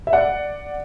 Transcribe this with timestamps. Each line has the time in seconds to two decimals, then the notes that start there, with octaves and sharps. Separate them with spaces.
0.07 E5
0.13 D5 F#5